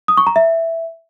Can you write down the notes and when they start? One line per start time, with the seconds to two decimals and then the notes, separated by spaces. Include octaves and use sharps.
0.08 D#6
0.17 C#6
0.27 A#5
0.36 E5